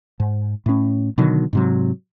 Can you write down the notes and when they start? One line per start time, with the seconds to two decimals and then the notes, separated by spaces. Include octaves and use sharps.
0.20 G#2
0.66 A2 C#4
1.18 B2 D3 D#3 F#3
1.53 G#2 C3 F#3